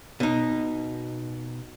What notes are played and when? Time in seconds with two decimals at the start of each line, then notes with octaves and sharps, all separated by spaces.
0.20 B2 D#4